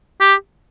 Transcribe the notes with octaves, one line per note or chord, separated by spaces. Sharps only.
G4